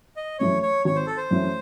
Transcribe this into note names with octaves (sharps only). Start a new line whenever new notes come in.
D#5
F#2 E3 A3 C#4 C#5
C#5
G#1 C#5
C5
A4
C5
F#2 E3 A3 C#4